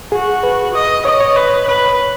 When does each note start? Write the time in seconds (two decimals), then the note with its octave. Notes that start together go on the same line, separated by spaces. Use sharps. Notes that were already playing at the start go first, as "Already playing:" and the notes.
0.12 F#4 G#4
0.43 B4
0.74 D#5
1.05 C#5 D#5
1.20 C#5
1.36 B4
1.67 B4